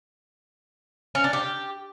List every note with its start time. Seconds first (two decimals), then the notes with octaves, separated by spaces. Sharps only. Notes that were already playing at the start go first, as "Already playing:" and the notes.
1.15 C#4
1.24 D4
1.33 G4